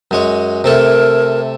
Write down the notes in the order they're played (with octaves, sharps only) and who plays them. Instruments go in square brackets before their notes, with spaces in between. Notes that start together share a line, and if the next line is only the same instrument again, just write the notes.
[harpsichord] F#2 G#3 C#5
[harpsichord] C3 A3 A4 [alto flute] A#4